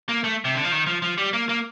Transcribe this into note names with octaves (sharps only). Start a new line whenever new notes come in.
A#3
A3
C3
D3
F3
D#3
F3
F3
G3
A#3
A#3